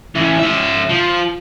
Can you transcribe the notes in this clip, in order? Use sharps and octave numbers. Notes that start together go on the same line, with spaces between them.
E3 C#4
C#4 E5
F3